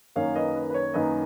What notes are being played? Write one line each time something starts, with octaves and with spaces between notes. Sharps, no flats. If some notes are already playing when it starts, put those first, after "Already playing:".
F#2 D#3 A#3 C#5 F5
B4 D#5
B4
B4
C#5
F#2 D#3 A#3 B4 D#5